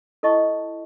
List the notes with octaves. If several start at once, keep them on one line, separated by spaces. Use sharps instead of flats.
E4 A4 D#5 A5 C#6